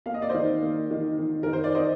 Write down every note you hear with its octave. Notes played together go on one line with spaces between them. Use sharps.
A#3 F5
D#5
D5
D#3 C5 D#5
A#3
D#3
D#3
D#3 A#4
C5
D5
C5 D#5